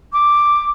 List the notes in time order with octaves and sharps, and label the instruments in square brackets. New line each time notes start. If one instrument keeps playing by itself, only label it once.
[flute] D6